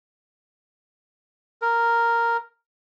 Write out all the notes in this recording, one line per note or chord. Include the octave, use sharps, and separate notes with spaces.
A#4